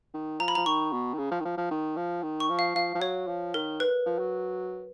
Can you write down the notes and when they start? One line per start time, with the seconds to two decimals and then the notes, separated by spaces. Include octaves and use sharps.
0.14 D#3
0.40 F3 A#5
0.48 B5
0.55 F3 A#5
0.66 D#3 C#6
0.93 B2
1.13 D#3
1.18 C#3
1.31 F3
1.40 D#3
1.45 F3
1.57 F3
1.71 D#3
1.96 F3
2.23 D#3
2.40 C#6
2.49 F3
2.59 F5
2.75 F3 F5
2.95 F3
3.01 F#3 C#5
3.27 F3
3.54 D#3 A#4
3.80 B4
4.06 F3
4.19 F#3